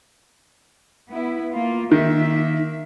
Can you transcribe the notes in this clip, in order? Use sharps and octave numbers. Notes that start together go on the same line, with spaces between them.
B3 E4
A#3 F4
D#3 A#3 E5